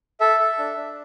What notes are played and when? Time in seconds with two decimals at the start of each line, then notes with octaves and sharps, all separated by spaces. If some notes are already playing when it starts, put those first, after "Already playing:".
0.20 A4 E5
0.40 A4
0.59 D4
0.77 D4